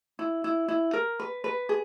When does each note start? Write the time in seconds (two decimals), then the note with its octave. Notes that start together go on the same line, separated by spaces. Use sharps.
0.19 E4
0.44 E4
0.68 E4
0.93 A#4
1.19 B4
1.44 B4
1.69 G#4